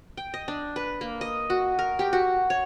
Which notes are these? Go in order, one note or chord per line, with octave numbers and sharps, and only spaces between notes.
G5
D#5
D4
B4
A#3
D#5
F#4
A#4
G4
F#4
C#5